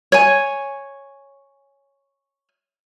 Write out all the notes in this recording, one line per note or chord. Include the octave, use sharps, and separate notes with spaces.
C#5 G#5